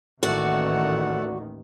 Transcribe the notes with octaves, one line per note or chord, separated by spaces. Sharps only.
A1 D#2 D#3 A3 F#4 D5 F#5